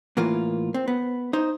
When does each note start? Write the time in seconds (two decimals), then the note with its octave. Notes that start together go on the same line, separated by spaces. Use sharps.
0.17 A2 E3 A#3 F4
0.74 C4
0.88 B3
1.33 D#4 C5